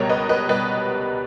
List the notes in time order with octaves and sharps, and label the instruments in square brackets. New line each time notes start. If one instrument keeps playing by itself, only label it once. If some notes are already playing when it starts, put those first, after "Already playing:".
Already playing: [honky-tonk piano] C#2 B2 G3 A#4 C#5
B4 D#5
B4 D#5
B2 G3 B4 D#5